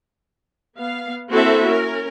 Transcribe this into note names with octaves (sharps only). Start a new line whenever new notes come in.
B3 F5
A#3 C4 E4 F#4 A4 E5
C#4 A#4